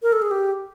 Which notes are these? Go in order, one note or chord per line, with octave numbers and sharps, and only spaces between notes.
A#4
A4
G#4
G4